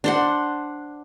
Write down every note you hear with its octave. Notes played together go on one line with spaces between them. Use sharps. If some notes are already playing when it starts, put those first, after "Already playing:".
D4 C5 F#5